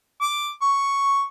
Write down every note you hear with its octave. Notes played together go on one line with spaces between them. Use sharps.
D6
C#6